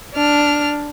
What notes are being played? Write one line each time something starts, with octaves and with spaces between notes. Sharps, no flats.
D4 F6